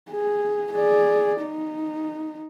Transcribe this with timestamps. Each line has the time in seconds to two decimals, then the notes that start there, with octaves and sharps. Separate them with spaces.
0.11 G#4
0.74 G#4 D5
1.42 D#4